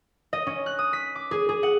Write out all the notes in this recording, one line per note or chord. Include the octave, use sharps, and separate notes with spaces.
D#5
C#4
F#6
D#6
B6
D6
G#4
G#4
F#5